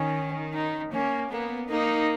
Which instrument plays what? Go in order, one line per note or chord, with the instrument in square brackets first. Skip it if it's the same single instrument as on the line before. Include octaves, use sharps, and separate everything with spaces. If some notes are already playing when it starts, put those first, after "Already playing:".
Already playing: [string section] D#3 [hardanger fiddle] C#4
[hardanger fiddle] D#4
[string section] A#3 [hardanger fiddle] C#4
[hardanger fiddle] A#3 [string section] B3
[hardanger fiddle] A#3 [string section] D#4